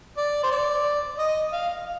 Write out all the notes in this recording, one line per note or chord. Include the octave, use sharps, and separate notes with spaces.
D5
C5
D5
D#5
F5